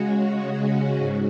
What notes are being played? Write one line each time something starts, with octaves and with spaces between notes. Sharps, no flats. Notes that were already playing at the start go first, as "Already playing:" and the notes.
Already playing: C#3 G#3 C#4 F#4
G#2